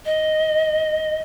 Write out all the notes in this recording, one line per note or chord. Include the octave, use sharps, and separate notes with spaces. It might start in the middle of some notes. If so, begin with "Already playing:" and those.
D#5